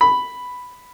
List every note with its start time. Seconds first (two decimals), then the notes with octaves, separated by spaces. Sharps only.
0.01 B5